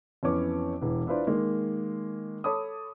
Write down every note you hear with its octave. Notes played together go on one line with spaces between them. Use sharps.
F2 E3 B3 C#4 C#5 D6
E1 E3
D4 E4 F4 B4 C5 D5
D#3 G#3 A#3
A4 C#5 A5 B5 D6 D#6